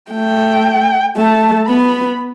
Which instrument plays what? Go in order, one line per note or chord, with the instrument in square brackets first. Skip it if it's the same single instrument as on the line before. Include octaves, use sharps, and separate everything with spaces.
[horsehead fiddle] A3 [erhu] G5
[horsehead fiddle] A3 [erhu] A5
[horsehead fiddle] B3 [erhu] B5